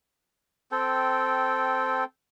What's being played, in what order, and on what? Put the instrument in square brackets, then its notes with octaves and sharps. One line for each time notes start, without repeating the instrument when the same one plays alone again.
[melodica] C4 A4 G5